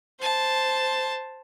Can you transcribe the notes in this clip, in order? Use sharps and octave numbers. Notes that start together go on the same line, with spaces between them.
C5 A5